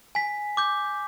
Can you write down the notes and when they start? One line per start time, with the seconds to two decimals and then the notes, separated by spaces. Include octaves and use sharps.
0.15 G#5 B6
0.57 D6 G6